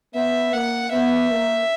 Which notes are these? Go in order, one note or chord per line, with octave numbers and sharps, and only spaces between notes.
B3 E5
A#3 F#5
B3 E5
A#3